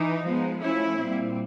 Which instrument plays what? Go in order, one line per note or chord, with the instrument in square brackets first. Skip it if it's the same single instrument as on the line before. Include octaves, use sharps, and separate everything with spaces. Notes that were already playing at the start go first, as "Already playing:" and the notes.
Already playing: [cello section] E3 [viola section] D#4
[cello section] F3 G#3 B3
[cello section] F3 A3 C#4 [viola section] E4
[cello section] A#2 G3 C4